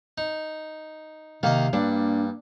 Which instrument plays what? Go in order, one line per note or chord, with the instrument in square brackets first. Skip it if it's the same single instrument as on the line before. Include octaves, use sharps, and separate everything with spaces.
[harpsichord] D#4
[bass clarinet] C3 [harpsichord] D#3 A#3 D#5 [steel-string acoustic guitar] F5
[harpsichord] G2 [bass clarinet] A#3 [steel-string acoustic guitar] D4